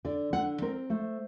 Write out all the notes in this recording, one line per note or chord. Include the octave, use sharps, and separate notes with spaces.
D3 D5
D3 F#5
C4 A#4
A3 C5